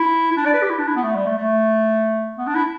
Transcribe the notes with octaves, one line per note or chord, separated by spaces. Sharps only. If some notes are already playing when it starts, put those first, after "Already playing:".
Already playing: E4
E4
D4
D5
B4
G4
E4
D4
E4
B3
A3
G3
A3
A3
B3
D4
E4